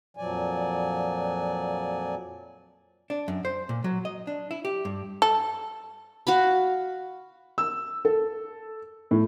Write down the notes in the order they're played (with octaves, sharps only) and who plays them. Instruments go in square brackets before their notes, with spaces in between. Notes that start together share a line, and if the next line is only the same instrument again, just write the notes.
[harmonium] F2 A#2 F3 F#3 D5 G#5
[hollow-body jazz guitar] D4
F#2
C5
A#2
F#3
D#5
D4
E4
G4
G2
[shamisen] A4
[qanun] F#4 F5 B5
[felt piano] E6
A4
A2